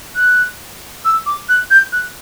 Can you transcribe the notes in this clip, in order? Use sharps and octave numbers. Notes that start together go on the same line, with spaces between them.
F#6
E6
D6
F#6
G6
F#6